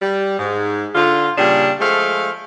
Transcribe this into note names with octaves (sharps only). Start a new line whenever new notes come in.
G3
G#2
D3 F4
A#2 C#3 G3 D4
F3 G#3 A3 F5